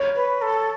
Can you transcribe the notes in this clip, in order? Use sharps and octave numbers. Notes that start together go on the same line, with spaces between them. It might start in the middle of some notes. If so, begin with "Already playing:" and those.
Already playing: C#5
B4
A4